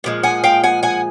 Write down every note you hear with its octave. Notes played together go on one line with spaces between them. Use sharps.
A#2 F3 G#3
F#5 G#5
F5 G5
F#5 G#5
F#5 G#5